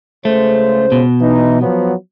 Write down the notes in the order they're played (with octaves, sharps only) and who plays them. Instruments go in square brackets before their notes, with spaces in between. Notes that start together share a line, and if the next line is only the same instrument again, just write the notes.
[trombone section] C#2 C#3 C5 [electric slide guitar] A3
[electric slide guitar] B2
[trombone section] E3 D#4
F3 F#3 B3